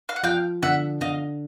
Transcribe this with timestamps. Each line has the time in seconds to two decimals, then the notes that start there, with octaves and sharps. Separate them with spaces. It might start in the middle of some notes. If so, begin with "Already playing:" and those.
0.09 F5
0.16 F#5
0.23 F3 F5 G5
0.63 D3 E5 F#5
1.01 D3 D#5 F5